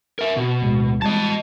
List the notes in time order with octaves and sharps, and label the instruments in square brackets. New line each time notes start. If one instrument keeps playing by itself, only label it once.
[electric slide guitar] A#4 E5
B2
[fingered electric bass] D2 A2 G#3
[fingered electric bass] E3 G3 G#3 [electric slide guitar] D#5 A5